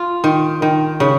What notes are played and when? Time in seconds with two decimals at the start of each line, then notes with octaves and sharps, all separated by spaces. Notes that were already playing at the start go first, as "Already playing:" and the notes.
Already playing: F4
0.24 D#3
0.62 D#3
1.00 C#3